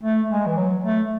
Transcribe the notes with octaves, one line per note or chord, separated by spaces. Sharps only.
A3
G#3
E3
F#3
A3